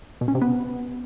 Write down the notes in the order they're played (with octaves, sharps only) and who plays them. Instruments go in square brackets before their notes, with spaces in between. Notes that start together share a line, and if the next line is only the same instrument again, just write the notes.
[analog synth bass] B2
C#4
C3
B3